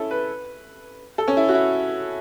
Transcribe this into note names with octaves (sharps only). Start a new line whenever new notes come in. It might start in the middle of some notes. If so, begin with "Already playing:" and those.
Already playing: C#4 E4 A4
B4
A4
C#4
E4
F#4
E4